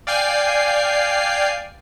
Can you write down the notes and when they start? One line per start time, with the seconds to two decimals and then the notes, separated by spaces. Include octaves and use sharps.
0.07 D5 F5 G5 G#5 C7